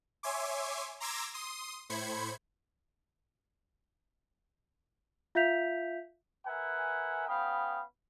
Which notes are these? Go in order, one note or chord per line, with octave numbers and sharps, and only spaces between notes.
C#5 E5 G#5 C6 D6
A#5 C6 D6 E6 G#6 A#6
C6 D#6
A2 C5 B5 G#6 C#7
F4 E5 F5 G6 B6 F7
A#4 B4 E5 F#5 G#5
B3 C#4 F5 G5 B5 D#6